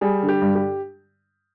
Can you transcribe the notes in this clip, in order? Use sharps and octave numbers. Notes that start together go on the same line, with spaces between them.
G3 G#4
D3
G4
G2
G4